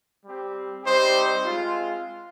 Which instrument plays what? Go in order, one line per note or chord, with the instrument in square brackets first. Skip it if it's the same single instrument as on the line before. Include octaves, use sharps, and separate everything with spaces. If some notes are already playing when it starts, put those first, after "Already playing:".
[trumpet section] G3 C4 G4
G3 C4 D#4 G4 C5
G#3 C4 F4